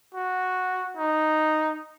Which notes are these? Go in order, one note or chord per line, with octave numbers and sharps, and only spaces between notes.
F#4
D#4